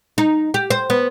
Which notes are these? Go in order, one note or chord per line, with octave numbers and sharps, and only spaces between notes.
D#4
G4
C5
B3